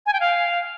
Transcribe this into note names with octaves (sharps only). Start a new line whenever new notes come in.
G#5
G5
F5